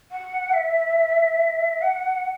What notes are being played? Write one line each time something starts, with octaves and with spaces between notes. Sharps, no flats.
F#5
E5
F#5